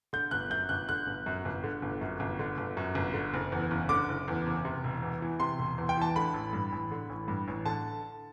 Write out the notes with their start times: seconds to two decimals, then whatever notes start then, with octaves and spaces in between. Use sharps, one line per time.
0.13 D3 G6
0.31 G1 F#6
0.50 F#2 G6
0.69 G1 F#6
0.89 D3 F#6
1.07 G1
1.26 F#2
1.45 G1
1.64 D3
1.82 G1
2.01 F#2
2.20 G1
2.39 D3
2.58 G1
2.77 F#2
2.95 G1
3.14 D3
3.34 F#1
3.52 E2
3.71 F#1
3.89 D3 D6
4.08 F#1
4.28 E2
4.46 F#1
4.65 C3
4.84 E1
5.03 E2
5.22 E3
5.40 C3 C6
5.59 E1
5.78 E2
5.89 G5
5.97 E3 A5
6.16 D3 B5
6.34 A1
6.53 G2
6.72 A1
6.91 D3
7.10 A1
7.28 G2
7.48 A1
7.66 D3 A5